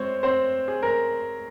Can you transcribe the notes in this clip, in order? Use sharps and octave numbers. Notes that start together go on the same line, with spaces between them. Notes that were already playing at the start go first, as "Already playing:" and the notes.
Already playing: G#3 C4 C5 C#5
C4 C5
G#4
A#4